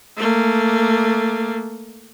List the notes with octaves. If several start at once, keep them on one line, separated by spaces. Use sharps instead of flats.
A3 A#3